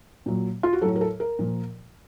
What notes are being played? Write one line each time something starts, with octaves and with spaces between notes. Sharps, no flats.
A#2 F#3
F4
F#4
A2 F#3 A4
A#4
A4
A#4
A#2 F3